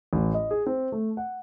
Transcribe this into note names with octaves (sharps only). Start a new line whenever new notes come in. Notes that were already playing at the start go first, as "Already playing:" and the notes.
A1
D#5
G#4
C4
A3
F#5